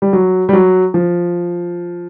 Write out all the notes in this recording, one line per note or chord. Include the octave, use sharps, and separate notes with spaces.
G3
F#3
G3
F#3
F3